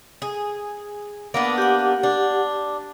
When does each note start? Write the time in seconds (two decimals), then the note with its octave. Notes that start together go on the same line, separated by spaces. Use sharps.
0.22 G#4
1.34 A#3 B3 D4
1.58 G4 F#5
2.03 D4